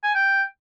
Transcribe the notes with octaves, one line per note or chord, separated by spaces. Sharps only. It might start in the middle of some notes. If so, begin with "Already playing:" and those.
G#5
G5